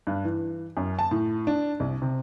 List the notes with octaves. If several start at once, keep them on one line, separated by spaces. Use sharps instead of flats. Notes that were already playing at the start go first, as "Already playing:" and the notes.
G2
E3
F#2
A5
A2
D4
C2
C3